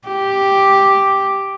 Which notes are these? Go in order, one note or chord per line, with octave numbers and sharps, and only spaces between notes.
G4